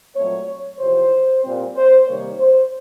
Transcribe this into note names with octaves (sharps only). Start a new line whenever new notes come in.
A#2 F#3 A3 C4 C#5
E2 C3 F3 C5
A#2 G3 C4
C5
C3 D#3 G3 A#3 C#5
C5